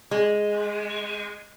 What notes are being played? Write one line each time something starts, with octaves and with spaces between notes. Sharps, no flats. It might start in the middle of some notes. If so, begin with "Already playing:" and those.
G#3